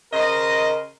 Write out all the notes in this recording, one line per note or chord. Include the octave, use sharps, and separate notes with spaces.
C#3 A#4 C5 D#5